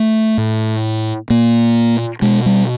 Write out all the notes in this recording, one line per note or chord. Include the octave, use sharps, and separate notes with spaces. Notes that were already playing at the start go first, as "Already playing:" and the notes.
Already playing: A3
A2
A#2 A#3
B2 G#3
G3